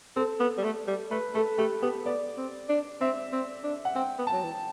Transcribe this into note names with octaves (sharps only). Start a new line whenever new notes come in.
C4 A4
B3
G3
A3
G3
A3 B4
A3 A4
A3 G4
B3 G4
B3 D5
C4
D4
C4 E5
C4
D4
F#5
C4 G5
B3
A5
F#3
E3